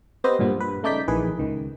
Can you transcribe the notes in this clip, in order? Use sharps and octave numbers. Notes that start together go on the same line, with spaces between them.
B3 C4 G4 B4 C5 D#5
G2 A#2 F3 B3
G2 B4
C#3 A3 D#4 D5 G6 B6
A#1 D#3 E3 G#4 B4
C#2 D#3